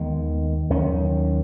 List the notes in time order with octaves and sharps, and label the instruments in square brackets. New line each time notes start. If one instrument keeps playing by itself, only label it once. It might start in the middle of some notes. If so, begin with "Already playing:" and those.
Already playing: [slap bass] D#2 D#3 G#3 B3
D#2 D#3 F#3 C#4